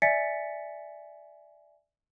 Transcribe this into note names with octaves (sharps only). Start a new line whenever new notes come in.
D5 E5 G#5 A6 B6 C#7